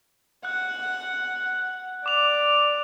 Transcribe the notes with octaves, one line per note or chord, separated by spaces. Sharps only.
F#5 F#6
D5 D6 F7